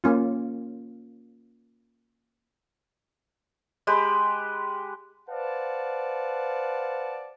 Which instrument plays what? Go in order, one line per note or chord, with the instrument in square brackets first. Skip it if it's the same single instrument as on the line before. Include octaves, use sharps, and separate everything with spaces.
[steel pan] A#3 C#4 F4
[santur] G#3 G4 B4
[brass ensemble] B4 C5 D5 F5 F#5 A5